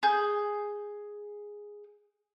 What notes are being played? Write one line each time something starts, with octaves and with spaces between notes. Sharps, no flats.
G#4 G6